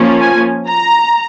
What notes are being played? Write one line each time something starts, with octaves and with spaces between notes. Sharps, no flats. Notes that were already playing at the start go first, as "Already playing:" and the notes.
Already playing: F3 A#3 C#4
G#5
A#5